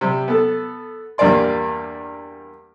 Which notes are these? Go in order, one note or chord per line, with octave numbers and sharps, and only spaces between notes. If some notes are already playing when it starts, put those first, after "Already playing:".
C3 G3
B3 A4
E2 G2 G3 A#3 D5 C6